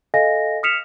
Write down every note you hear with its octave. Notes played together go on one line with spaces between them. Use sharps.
A4 D#5 F5 G#5 A#6
D#6 F6 B6 C#7 E7 F7